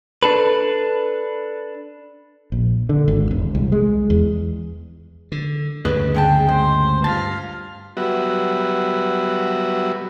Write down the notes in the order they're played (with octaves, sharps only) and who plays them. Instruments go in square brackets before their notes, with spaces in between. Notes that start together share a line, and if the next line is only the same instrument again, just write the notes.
[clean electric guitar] D4 A4 B4
[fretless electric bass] A#1
D3
G#1
E1
C2
G#3
E2
[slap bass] D3
[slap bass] D2 G2 C#3 [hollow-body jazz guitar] G#4 B4 D#5
[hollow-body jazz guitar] D3 G#3 A5 [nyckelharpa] G#4 G5
[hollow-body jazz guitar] G#3 [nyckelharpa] C5
[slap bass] G2 [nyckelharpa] F4 F5 [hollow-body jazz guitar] A5
[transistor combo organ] F#3 G3 B3 F#4 E5